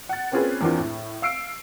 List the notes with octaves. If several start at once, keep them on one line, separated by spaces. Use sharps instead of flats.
F#5 A6
A#3 C4 C#4 F4 G#4 B4
E2 A#3 C4 D4 F4
A2
F5 E6 C7 D7